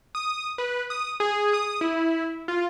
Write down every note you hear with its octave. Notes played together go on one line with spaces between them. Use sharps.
D#6
B4
D#6
G#4
D#6
E4
F4